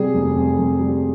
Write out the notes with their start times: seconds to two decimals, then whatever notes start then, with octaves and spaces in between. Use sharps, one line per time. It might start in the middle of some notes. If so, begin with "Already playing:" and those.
Already playing: C3 G3 G#4
0.14 F1
0.36 F2
0.58 F2
0.79 G3